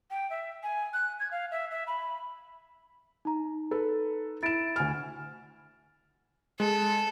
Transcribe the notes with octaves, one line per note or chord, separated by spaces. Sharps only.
G5
E5
G#5
F#6
G#6
F5
E5
E5
B5
D#4 A#5
A4 B4
E4 A6 D7 E7
D2 G#5 F6
G#3 A4